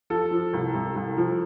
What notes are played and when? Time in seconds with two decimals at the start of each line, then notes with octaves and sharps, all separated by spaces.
0.10 F3 A4
0.31 F3
0.53 C2
0.74 C2
0.96 C2
1.17 F3